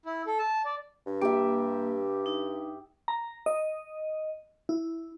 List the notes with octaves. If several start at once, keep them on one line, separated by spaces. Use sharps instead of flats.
E4
A4
A5
D5
G2
A#3 G4 E5
D#4
A#5
D#5
E4